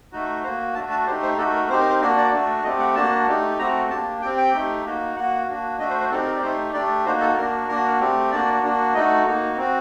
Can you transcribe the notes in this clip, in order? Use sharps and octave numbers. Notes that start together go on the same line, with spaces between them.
A3 D#4 F#4
A#3 F#4 C5
A3 D4 F#4 A5
A5
A3 D#4 G4 C5
C5
A3 D#4 F#4 A4
A#4
C4 D#4 G4 C5
A#4
C5
A#3 D4 F#4 A#4
D5
A3 D4 F#4
A3 C4 G4 D#5
F#5
A#3 D4 F#4 A5
A3 D#4 G4
A3 C4 F#4 A#5
A#3 D4 G4 A5
C4 G4 G5
G5
A3 D#4 G4
A#3 D#4 F#4
A#3 F#4 F#5
A#3 D4 F#4
A3 D4 F#4 D#5
C5
C5
C4 D#4 G4 A4
A#4
D5
A3 D#4 G4 C5
A3 D4 G4 D5
A#3 D#4 F#4 C5
A4
A#3 D4 F#4 A#4
A#3 D4 F#4 A#4
A3 C4 G4
A#3 D4 F#4 D5
A#3 D4 F#4
A3 D#4 F#4 D#5
A#3 D#4 F#4
C4 F#4